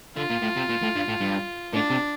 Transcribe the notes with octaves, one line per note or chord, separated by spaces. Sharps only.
D3 F4
A#2
A2
C3
A#2
A2
G2
A2
G2
A2 D4
C3